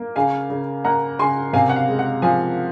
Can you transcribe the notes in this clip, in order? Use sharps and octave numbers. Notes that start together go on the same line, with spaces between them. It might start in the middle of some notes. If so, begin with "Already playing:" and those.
Already playing: A#3
C#3 F5 G#5
C#3
A#3 F#5 A#5
C#3 G#5 C6
C3 F5 G#5
F#5
F5
G#3
F#5
F3 F5 G#5